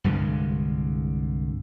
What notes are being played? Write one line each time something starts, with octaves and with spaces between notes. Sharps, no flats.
C2 G2 D3 G#3